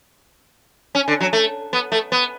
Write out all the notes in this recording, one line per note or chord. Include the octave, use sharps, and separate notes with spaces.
C#4
D3
F#3
A3
B3
A3
B3